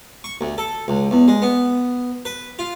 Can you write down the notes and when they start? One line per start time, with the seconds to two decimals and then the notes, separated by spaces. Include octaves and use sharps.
0.24 C#6
0.41 D2
0.58 A4
0.88 C#2
1.11 E2
1.28 G#3
1.42 B3
2.25 B4
2.59 F4